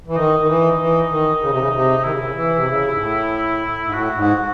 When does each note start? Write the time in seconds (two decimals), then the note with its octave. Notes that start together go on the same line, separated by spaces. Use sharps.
0.08 E3
0.16 D#3 D#4
0.40 D#3
0.47 E3
0.79 E3
1.11 D#3
1.42 C#3
1.51 C3
1.59 C#3
1.73 C3
2.04 D#3 E4
2.11 C#3
2.18 C3
2.25 C#3
2.36 E3
2.56 C3
2.67 C#3
2.93 G#2
2.98 A2
3.85 G#2
3.92 A2 F#4
4.16 G#2